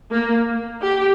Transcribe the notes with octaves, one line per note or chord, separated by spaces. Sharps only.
A#3
G4